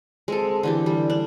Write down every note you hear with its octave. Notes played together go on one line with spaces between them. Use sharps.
G#3 C4 A4
D3 E3 G4
G3
D4